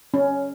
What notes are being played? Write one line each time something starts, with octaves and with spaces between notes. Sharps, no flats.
C#4